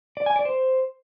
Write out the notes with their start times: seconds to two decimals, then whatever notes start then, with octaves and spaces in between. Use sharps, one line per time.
0.17 D5
0.26 G#5
0.36 D5
0.45 C5